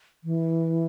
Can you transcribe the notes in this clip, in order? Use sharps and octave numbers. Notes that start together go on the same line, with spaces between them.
E3